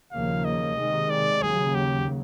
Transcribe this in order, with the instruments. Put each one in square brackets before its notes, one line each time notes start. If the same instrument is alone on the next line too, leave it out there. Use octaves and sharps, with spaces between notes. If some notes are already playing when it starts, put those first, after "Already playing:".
[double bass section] D#2 C#3 F3 A#3 [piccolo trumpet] F5
[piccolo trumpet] D#5
[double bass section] C3 D#3 G#3
[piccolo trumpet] D5
[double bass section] D#2 C#3 F#3 [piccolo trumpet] G#4
[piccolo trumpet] G4